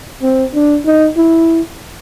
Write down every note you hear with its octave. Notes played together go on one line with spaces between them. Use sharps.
C4
D4
D#4
E4